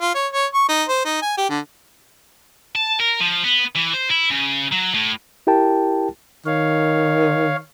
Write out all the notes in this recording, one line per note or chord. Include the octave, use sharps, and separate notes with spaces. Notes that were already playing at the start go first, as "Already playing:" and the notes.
F4
C#5
C#5
C#6
D#4
C5
D#4
G#5
G4
D3
A5
A#4
F3
B3
E3
C5
E4
C#3
F#3
A2
E4 G4 A#4 G5 A5
D#3 C#5 F5